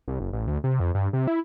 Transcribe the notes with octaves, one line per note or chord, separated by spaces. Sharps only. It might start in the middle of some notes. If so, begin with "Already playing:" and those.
C2
F#1
A1
D2
C3
F2
G2
C3
E4